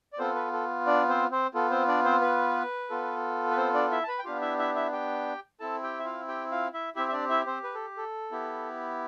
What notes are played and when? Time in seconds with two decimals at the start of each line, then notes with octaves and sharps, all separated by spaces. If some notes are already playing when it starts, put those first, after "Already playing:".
0.13 D5
0.18 B3 C4 F4 A4 C5
0.35 B4
0.53 A4
0.86 D4 D5
1.09 C4 C5
1.31 C4 C5
1.54 B3 F4 A4
1.71 C4 C5
1.88 D4 D5
2.05 C4 C5
2.21 B4
2.90 B3 F4 A4
3.51 B4
3.57 C4 C5
3.74 D4 D5
3.91 E4 E5
4.03 A5
4.08 B4 B5
4.19 G5
4.25 B3 D4 F4 G4 F5
4.41 E4 E5
4.59 E4 E5
4.75 E4 E5
4.92 G4 G5
5.60 C4 E4 A4 A5
5.83 G4 G5
5.99 E5
6.05 F4 F5
6.28 G4 G5
6.51 F4 F5
6.73 E4 E5
6.96 C4 E4 G4 E5
7.08 E5
7.12 D4 D5
7.29 E4 E5
7.47 C4 C5
7.64 B4
7.75 A4
7.97 A4
8.31 B3 E4 G4